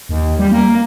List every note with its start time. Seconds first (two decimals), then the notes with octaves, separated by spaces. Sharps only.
0.09 D#2
0.39 G3
0.51 A#3